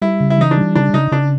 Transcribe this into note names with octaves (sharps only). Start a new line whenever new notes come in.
G3 E4
C#3
E4
E3 D#4
D4
G3
C#3 D4
C#3 D#4
C#3 D4